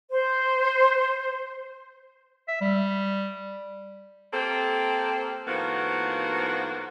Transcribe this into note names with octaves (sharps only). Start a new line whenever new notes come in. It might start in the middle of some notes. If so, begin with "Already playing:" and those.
C5
E5
G3
A#3 C4 G4 A4
A2 D#3 F3 A#3 B3 F#4